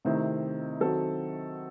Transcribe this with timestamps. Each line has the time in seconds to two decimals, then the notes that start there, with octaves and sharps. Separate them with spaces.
0.05 C3 D#3 A3 C4 E4
0.80 D#3 F#3 C4 F#4 A4